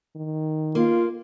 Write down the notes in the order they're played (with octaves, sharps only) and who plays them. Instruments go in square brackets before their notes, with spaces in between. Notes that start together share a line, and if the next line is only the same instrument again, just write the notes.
[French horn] D#3
[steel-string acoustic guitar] A#3 [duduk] F4